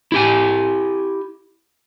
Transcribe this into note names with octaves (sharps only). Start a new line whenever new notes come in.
E4 G4 G#5